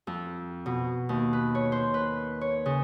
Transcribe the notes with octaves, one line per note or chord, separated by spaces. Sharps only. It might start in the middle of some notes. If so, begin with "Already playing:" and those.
F2
B2
D#2
B4
C#5
C5
B4
C#5
C#3